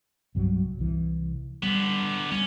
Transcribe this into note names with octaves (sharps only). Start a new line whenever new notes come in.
C2 G2 F#3
C2 E3
D3 G3 B3
G3 C#4